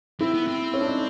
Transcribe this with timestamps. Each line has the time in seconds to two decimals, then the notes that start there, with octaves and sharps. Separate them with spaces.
0.20 C4 E4
0.34 B3
0.47 C4
0.74 C#4
0.81 D4
0.88 D#4